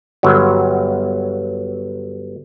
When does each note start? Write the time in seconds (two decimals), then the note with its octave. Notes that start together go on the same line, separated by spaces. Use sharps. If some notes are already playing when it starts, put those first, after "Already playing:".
0.23 G1 F#3